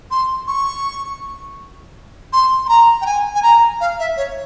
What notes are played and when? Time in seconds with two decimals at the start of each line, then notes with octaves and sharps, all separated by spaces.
0.11 C6
0.48 C#6
2.33 C6
2.66 C6
2.69 A#5
3.01 G5
3.06 G#5
3.35 G#5
3.43 A#5
3.81 F5
3.99 E5
4.17 C#5